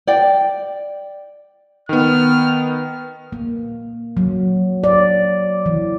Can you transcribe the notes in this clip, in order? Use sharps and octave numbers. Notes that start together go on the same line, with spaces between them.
D5 G5
D#3 B3 F6
A#3
F#3
D5
E3